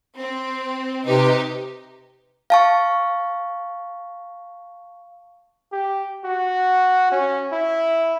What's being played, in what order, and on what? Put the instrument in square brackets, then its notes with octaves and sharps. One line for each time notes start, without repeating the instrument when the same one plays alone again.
[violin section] C4
[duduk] C3 [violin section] D#4 G4 [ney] B4
[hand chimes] F5 A5 C#6
[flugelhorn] G4
F#4
C#4
E4